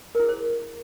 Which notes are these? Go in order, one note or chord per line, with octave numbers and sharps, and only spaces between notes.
E4 G#4 A#4 C5